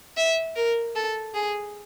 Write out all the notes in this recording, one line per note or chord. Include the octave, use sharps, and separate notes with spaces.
E5
A#4
A4
G#4